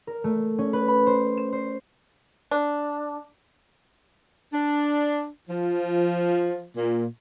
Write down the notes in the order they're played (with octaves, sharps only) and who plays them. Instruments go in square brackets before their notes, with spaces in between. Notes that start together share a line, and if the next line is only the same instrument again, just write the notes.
[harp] A#4
A3
C#4
B4
B5
C5
E7
C5
[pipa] D4
[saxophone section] D4
F3
A#2